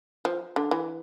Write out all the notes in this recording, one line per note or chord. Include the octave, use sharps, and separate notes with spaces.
F3
D3
E3